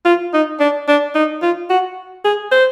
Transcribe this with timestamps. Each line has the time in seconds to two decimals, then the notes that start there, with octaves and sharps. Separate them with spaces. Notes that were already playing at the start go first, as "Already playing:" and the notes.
0.05 F4
0.34 D#4
0.60 D4
0.88 D4
1.15 D#4
1.42 F4
1.70 F#4
2.24 G#4
2.52 C5